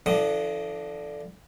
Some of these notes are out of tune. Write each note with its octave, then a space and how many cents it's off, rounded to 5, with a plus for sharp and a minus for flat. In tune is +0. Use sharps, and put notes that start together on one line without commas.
D3 +0 F3 -45 D#6 +0